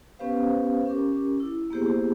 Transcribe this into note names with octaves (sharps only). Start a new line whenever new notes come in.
B3 C#4 G4 B4 C5 F5
C#4 G4 A#4 D6
E4
A#3 B3 E4 G4 G#4 C5